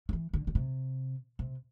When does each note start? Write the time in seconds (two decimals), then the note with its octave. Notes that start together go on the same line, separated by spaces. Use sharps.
0.09 F3
0.13 E3
0.34 D3
0.47 D3
0.55 C3
1.39 C3